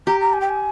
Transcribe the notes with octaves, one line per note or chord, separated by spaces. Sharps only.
G4 A#5
A#5
G#5
G5
G#5